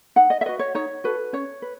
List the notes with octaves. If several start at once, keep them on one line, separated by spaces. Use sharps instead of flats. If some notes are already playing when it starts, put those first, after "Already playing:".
D#4 F#5
D#5
E5
F#4 B4 D#5
C#5
D#4 C#5
F#4 A4 B4
C#4 C#5
B4